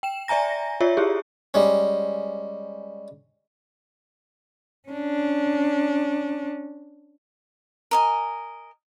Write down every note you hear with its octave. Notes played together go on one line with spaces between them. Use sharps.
G5 E7
D5 E5 G#5 A#5 A#6
F4 C#5 D5 E5
E4 G4 G#4
G3 G#3 C#4
C#4 D4
A#4 D#5 G#5